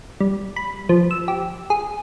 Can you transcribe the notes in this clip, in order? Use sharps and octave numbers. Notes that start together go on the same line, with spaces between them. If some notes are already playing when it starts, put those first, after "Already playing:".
G3
B5
F3
E6
G4
G#4